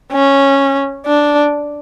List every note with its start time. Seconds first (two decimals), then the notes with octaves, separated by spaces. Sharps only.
0.12 C#4
1.06 D4